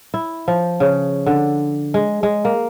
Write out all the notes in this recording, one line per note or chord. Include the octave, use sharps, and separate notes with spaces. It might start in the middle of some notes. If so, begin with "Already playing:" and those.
E4
F3
C#3
D3
G#3
G#3
A#3